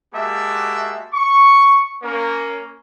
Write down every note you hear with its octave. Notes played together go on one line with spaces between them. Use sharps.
G#3 A#3 F#4 G4 E5 A5
C#6
A#3 C#4 A#4